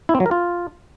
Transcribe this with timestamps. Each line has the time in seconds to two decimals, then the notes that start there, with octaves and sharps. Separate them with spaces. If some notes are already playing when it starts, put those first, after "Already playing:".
0.09 E4
0.15 C4
0.20 F#3
0.26 A#4
0.31 F4